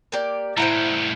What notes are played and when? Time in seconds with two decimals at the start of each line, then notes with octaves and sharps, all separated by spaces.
0.12 A#3 G4 D5
0.57 A2 G3 E4 C5 F#5 A#5